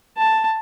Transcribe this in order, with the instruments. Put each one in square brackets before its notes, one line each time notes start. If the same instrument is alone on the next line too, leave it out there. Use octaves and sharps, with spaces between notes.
[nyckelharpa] A5